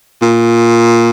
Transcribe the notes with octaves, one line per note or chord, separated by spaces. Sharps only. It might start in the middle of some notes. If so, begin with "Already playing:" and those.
A#2